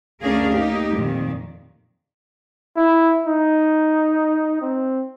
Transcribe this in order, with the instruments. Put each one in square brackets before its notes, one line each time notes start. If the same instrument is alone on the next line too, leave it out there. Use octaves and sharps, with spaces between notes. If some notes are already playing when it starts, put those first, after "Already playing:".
[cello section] D2 C#4 D4 G#4 A#4 F5
A#3 D#4 G4
F2 A#2 D#3
[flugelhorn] E4
D#4
C4